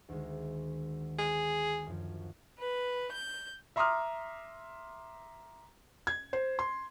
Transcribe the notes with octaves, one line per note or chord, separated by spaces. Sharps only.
D2 D#3 G#3
G#4
F#2 F3
B4
G6
E5 A#5 C6 D6 D#6 F6
G#6
C5
C6